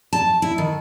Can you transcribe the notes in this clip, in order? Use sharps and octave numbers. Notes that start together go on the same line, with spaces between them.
A5
E4
D#3